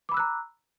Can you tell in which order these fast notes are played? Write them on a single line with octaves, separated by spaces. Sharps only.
D6 B5 E6 F#6 A#5